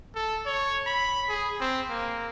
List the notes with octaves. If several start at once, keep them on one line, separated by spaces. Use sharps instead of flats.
A4
C#5
B5
G#4
C4
A#3